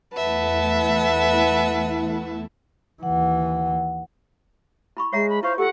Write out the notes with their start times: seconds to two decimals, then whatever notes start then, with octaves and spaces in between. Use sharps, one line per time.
0.15 E2 A3 E4 B4 E5 F#5 A5
3.03 D#2 E3 F#5
4.97 E4 B5 C#6
5.13 G#3 C#5 E5 A#5 C7
5.29 B5
5.43 E4 F4 C5 F5 C#6
5.58 F4 G4 A4 F#5